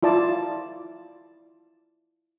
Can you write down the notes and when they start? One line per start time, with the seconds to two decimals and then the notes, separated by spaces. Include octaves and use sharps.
0.03 E4 F4 D5 A5